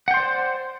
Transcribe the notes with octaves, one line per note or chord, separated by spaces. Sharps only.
C5 D5 F#5 G5 C6